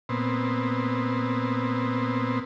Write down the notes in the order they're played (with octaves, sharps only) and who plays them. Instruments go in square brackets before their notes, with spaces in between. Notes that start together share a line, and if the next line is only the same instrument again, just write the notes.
[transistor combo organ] A#2 B3 C4